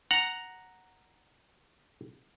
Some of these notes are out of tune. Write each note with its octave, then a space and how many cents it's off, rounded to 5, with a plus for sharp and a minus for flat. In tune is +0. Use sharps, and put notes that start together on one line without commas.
F#5 +0 A#5 +0